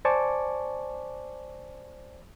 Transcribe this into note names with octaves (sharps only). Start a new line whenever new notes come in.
C5 D5 G#5 A5 C#6 D6